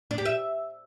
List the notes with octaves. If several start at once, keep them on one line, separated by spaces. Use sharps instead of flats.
D4
G4
E5